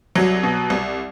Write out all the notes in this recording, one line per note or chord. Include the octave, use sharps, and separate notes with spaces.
C2 F#3
B2
C2